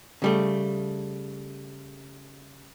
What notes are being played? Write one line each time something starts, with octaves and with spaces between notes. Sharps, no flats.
C#3 G3 A3